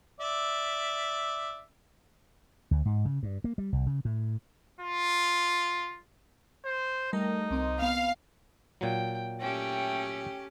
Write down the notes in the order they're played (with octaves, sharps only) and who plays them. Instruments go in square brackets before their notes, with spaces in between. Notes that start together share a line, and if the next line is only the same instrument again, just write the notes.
[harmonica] D5 E5
[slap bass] D2
G#2
C#3
G2
A#3
G3
C2
C#3
A2
[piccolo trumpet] F4
[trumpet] C5
[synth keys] G3 A3 A#4 [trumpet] D#4
[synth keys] C2 C4 D#5
[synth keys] B3 [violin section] F5
[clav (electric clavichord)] A#2 F#3 [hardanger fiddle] G5
[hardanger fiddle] A3 G5 [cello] C#4 G4